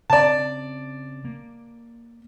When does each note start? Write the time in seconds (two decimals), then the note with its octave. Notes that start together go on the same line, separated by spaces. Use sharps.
0.10 C#3 C4 D5 A5
1.25 A#3